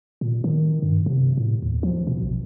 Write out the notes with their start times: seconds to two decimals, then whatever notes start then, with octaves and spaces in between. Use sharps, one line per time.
0.21 A#2
0.44 D#3
0.82 G2
1.06 C3
1.37 A2
1.62 D#2
1.83 F3
2.07 B2
2.23 A#1